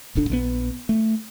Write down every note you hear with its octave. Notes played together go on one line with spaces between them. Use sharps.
D1 G1 D3 D4
A#1 G#3 B3
A3